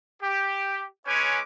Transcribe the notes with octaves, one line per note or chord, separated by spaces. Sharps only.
G4
G#3 C#4 B4 C#5 G#5 D6